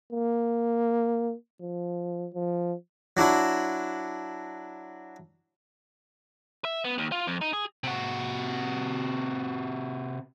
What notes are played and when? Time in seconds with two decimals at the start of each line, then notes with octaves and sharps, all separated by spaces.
0.12 A#3
1.61 F3
2.34 F3
3.17 F#3 D4 E4 F#4
6.65 E5
6.84 B3
6.98 D#2
7.12 F4
7.27 F2
7.41 D#4
7.53 G#4
7.84 C3 F#4